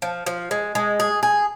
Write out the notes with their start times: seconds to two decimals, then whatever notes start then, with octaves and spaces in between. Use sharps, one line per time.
0.02 F3
0.26 F3
0.51 G#3
0.75 G#3
1.00 G#4
1.23 G#4